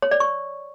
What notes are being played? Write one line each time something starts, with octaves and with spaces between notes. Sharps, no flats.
C#5
D5
C#6